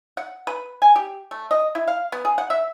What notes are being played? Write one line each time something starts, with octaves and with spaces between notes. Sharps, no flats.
F#5
B4
G#5
G4
A3
D#5
E4
F5
B3
G#4
F#5
E5